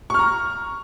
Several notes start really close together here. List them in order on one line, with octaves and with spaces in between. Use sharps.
C#6 F6 A#5